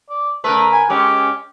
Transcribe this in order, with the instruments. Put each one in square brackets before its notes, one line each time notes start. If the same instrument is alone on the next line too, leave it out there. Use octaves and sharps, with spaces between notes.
[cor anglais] D5
[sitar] C#3 A#4 B4 [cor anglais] A3
[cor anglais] G#5
[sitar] G#3 C#4 [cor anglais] G4